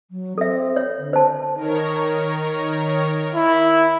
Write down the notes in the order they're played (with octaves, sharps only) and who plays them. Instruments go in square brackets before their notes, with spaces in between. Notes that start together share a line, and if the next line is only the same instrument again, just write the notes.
[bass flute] F#3
[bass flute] C4 [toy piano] A4 E5
[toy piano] C#5
[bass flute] D3
[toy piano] C5 A5
[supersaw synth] D#3 A#4 C#5
[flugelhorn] E4